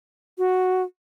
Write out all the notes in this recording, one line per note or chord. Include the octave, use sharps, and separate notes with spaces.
F#4